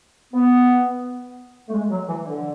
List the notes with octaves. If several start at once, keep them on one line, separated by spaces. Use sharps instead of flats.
B3
A3
G#3
F#3
E3
D3